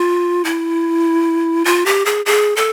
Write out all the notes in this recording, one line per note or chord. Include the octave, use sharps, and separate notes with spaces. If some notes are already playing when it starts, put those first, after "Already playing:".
Already playing: F4
E4
F4
G4
G#4
G#4
A4